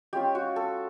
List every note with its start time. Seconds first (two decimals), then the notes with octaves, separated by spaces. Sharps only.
0.13 G#3 C#4 F4 G4
0.35 F#4
0.56 A4